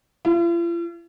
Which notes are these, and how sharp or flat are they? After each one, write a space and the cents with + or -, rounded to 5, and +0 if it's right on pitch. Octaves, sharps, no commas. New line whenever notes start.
F4 -45